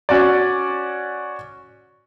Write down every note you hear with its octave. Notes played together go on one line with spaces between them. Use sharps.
C#4 F#4 D5